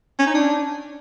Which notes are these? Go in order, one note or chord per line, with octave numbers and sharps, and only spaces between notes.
C#4
D#4
D4